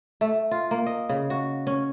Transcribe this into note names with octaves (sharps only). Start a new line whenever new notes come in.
A3
F4
A#3
D#5
C#3
F#4
C#4